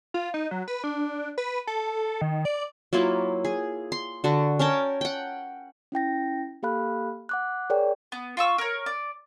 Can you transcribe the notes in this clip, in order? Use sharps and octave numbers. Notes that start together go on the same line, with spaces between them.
F4
D#4
F#3
B4
D4
B4
A4
D#3
D5
F#3 A#3 E4 F4
G#4
C6
D3 F#4
C#4 A#4 G5 A5
F#5 G5
C#4 E4 G5 A#6
A#3 G4 A4 F5 B5 F#6
F#5 D6 F#6
G#4 A#4 C#5 D5 G5
B3
F4 C#6 E6
A#4 C#5
D5